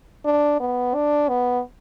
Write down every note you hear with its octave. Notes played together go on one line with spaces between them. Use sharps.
D4
B3
D4
B3